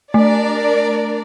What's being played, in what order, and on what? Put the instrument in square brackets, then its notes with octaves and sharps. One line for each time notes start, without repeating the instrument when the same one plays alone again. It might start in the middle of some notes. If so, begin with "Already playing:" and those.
[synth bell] A3 [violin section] D4 A#4 D5